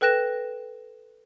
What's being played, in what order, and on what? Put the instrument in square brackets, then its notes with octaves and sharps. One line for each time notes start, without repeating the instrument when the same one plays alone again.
[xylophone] A4 B4 G5 F#6 A#6 E7